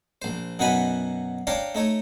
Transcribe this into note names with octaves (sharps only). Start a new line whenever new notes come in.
A#1 C5
F#2 B2 D#4 F#4 G#5 B5
D4 C#5 D5 F5 G5 A#5
A3 D#4 C#5